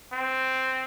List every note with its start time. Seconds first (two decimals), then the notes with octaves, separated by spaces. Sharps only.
0.13 C4